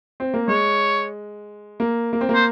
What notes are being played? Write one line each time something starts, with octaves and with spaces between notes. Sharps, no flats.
C4
A#3
G#3 C#5
A#3
A#3
C4
A#3
C5